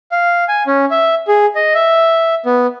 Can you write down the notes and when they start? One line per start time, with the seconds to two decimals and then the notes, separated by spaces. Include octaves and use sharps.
0.12 F5
0.48 G#5
0.67 C#4
0.91 E5
1.28 G#4
1.55 D#5
1.74 E5
2.46 B3